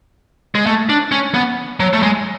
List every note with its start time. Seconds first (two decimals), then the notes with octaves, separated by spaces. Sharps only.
0.55 G#3
0.66 A3
0.89 D4
1.12 C#4
1.34 B3
1.80 F#3
1.93 A3
2.03 G#3